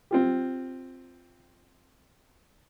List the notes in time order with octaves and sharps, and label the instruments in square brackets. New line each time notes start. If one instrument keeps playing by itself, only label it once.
[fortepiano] C4 F4 G4